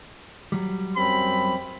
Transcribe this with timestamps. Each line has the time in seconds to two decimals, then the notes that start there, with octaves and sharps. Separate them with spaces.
0.52 F#3 G3
0.97 F#2 C4 B5